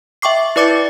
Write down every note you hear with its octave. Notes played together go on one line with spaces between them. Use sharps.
E5 G5 C#6 D6 C7
E4 B4 D5 D6 A6 C#7